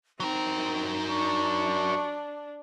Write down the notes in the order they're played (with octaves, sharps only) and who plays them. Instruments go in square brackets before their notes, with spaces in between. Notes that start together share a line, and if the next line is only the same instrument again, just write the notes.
[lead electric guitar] F#3 A#4 [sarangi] C4 [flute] D#4
[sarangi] D4 [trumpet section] C#6